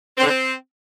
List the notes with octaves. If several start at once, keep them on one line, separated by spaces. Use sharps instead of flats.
C4
D3
C4